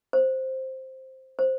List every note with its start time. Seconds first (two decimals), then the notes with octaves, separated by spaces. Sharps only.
0.13 C5
1.39 C5